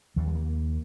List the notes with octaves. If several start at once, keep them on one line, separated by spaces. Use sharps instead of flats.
D#2 F3
G#3
A#3